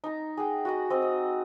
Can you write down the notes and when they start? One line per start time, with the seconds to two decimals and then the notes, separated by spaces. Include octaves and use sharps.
0.04 D#4 A#5
0.37 G#4 F#5 G5
0.65 F#4 D#5 F#5
0.90 C4 D#5
1.02 D#5